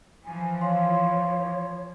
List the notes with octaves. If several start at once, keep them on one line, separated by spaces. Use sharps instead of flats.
E3 F3 G#5
C#5 F5 C6